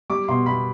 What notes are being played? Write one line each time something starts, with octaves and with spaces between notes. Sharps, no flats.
G3 D6
B2 C6
G3 B5